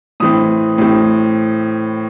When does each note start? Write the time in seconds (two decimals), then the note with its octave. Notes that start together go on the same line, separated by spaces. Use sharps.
0.20 A2 E3 C4 D#6
0.78 A2 E3 C4